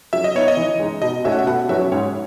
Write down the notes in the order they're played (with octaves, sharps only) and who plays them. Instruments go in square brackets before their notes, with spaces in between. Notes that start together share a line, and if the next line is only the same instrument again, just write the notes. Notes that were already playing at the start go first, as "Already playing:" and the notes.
[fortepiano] F#3 [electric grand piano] E5
[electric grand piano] D#5
[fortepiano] B3 D#4 [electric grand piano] C#5
[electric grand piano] D#5
[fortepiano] E3
G#3 D#4
[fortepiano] B2 [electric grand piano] D#5
[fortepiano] A3 C#4 F#4 A4 [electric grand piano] E5
[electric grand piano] F#5
E5
[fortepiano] B2 [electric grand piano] F#5
[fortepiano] F#3 C#4 F#4 B4 [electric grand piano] E5
[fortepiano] G#2 [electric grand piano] C#5